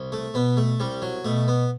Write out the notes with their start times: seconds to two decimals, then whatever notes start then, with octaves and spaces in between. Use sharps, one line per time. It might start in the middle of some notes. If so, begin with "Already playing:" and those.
Already playing: C2
0.12 A3
0.34 B2 B3
0.57 A3
0.80 C2 G3
1.02 F#3
1.25 B2 A3
1.48 B3